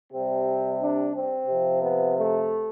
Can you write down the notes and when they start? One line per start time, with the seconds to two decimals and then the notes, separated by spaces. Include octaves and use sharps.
0.12 C3 G3 C4
0.80 D4
1.14 C4
1.48 C3 F3
1.82 B3
2.16 A3